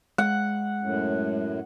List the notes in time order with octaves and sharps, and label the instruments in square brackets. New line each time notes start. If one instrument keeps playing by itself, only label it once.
[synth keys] G#3 [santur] F#5
[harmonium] F#2 A2